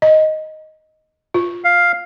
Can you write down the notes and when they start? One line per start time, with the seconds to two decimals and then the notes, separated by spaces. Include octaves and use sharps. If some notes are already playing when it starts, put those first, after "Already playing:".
0.02 D#5
1.34 F4
1.64 F5